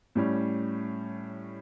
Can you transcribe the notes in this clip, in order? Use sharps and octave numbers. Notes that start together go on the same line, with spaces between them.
A2 G3 C#4